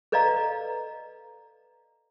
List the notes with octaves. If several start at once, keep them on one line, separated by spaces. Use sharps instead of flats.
A4 B4 D5 D#5 F5 A#5